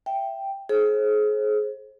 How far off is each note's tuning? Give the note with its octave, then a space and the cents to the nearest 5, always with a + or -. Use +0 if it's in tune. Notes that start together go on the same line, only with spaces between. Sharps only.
E5 +15 G5 +0
G#4 +35 C5 +35